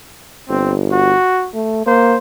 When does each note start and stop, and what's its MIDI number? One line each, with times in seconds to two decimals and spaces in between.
0.49 1.13 31
0.49 0.75 60
0.92 1.50 66
1.54 1.82 57
1.87 2.17 58
1.87 2.17 72